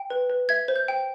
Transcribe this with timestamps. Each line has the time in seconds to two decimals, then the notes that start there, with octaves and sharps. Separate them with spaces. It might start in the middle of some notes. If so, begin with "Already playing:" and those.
Already playing: G5
0.10 B4
0.30 B4
0.49 E5 G#6
0.68 C5
0.76 G6
0.88 G5